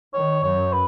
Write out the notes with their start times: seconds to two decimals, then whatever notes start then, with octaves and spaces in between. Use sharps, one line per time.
0.13 D#3 C#5
0.43 F#2 C#5
0.72 B4